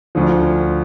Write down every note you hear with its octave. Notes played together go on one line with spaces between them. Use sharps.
D2 D3 F3